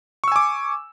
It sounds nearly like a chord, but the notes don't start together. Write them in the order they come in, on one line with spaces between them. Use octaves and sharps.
C#6 E6 G#5 D6